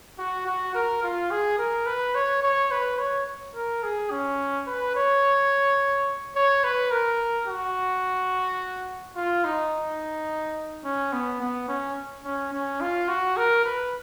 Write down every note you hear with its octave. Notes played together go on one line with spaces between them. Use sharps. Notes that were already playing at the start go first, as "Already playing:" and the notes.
F#4
F#4
A#4
F4
G#4
A#4
B4
C#5
C#5
B4
C#5
A#4
G#4
C#4
B4
C#5
C#5
B4
A#4
F#4
F4
D#4
C#4
B3
B3
C#4
C#4
C#4
F4
F#4
A#4
B4